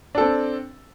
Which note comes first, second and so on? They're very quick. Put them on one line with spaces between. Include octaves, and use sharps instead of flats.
D4 A4 C4